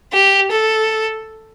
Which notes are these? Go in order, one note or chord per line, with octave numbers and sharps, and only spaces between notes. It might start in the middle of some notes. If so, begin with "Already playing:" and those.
G4
A4